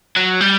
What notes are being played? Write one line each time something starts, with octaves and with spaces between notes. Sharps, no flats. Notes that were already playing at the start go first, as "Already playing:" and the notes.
F#3
G3